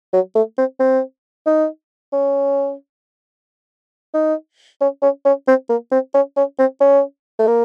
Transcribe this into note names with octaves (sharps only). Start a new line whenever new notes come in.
F#3
A3
C4
C4
D#4
C#4
D#4
C#4
C#4
C#4
C4
A#3
C4
C#4
C#4
C4
C#4
A3
A#3